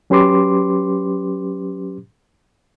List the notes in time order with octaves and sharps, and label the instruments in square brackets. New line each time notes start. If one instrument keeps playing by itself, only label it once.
[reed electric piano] F#3 C#4 G4 B4 C6 D6